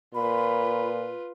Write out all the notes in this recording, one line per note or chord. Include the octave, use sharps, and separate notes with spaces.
A#2 F4 B4 B5